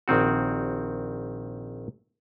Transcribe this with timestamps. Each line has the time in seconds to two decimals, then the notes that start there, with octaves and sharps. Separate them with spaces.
0.08 A#1 D#3 C4 F#4